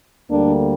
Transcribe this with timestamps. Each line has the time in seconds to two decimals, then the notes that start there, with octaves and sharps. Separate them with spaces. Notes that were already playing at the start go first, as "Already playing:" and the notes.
0.29 D2 D3 G3 A#3 D4